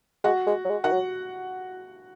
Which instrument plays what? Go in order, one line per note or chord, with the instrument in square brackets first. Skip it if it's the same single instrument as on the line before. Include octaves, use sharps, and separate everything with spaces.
[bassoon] G#3 [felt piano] F#4 F#5
[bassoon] G#3
F#3
G#3
[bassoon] D#3 [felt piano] F#4 F#5
[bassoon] F#3